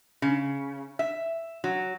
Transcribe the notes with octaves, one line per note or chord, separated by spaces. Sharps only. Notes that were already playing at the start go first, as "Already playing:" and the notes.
C#3
E5
F#3